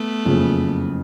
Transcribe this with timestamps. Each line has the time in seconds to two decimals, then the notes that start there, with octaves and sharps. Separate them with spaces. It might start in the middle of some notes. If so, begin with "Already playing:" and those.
Already playing: A3 B3
0.25 F#1 F2 C#3